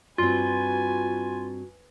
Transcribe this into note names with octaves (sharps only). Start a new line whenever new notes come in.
G2 C4 F4 F#4 B4 G#5